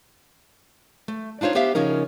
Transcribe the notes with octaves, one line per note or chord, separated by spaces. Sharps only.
A3
D4 D#4 F4 C5 C#5
B3 G4 C5 E5 F5
C#3 F3 C#4 D#4 A#4